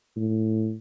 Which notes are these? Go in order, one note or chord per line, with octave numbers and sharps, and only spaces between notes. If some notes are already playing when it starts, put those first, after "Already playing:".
A2